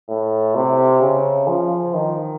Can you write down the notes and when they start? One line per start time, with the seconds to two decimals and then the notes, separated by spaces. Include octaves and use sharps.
0.09 A2
0.55 C3
1.01 C#3
1.48 F3
1.94 D#3